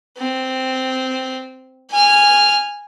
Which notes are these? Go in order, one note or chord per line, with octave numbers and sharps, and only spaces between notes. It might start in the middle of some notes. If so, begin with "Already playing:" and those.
C4
G#5 F6